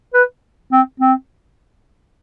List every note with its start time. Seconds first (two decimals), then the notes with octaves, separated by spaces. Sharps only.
0.14 B4
0.72 C4
1.00 C4